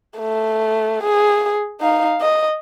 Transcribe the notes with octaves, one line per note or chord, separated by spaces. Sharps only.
A3
G#4
D#4 F5
D#5